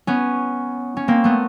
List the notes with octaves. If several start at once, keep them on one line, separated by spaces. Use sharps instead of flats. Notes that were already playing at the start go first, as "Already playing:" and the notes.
B3 C#4
C#4
A#3 C4
A3 B3